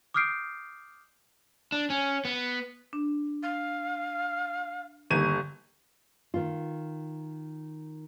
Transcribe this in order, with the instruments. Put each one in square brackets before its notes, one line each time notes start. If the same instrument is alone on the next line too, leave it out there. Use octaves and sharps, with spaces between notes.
[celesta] D6 D#6 F6 G6 C7 D7
[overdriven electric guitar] D4
C#4
B3
[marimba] D4
[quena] F5
[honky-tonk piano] G1 D#2 D#7 [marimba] G4
[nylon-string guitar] D#3 F4